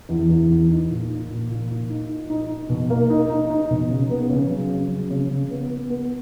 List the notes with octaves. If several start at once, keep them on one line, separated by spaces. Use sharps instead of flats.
E2
E2
E2
D#4
A#2
D#4
A#2
A#2
A#2
D#4
D#4
D#4
D#4
B2
A#3
D#4
D#4
D#4
B2
C#3
B3
C#3
F#3
C#3
F#3
C#3
C#3
B3
B3
B3